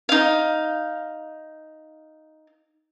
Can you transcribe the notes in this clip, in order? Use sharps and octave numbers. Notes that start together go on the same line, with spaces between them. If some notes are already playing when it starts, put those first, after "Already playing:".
D#4 F5